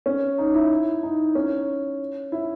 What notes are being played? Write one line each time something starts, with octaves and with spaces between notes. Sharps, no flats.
C#4
D#4
E4
D#4
C#4
E4